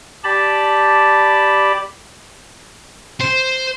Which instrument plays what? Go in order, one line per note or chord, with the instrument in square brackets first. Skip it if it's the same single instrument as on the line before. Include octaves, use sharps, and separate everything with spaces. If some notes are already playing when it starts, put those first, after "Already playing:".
[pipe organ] G4 D5 A5 B5
[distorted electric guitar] C5